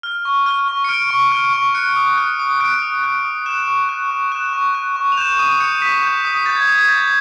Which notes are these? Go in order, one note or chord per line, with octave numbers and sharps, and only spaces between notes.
F6
C#6
F6
C#6
C#7
F6 D7
C#6
F6
C#6
F#6 C#7
D#6
F#6
D#6
F#6 D7
D#6
F#6
D#6
F#6 E7
C#6
F#6
C#6
F#6 E7
C#6
F#6
C#6
F7
G6 E7
D#6 D#7
G6 C#7
D#6 B6
G6
D#6
G6 A6
G#6
D#6 G#6
G#6
G6 A6